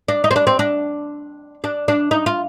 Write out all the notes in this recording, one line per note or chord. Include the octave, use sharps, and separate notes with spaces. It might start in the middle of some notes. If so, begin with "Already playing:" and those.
D4
D#4
C4
D4
C4
D4
D4
D4
D#4
F4